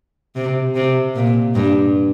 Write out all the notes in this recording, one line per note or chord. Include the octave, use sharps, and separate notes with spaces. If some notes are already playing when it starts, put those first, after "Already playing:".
C3
C3
A#2
G2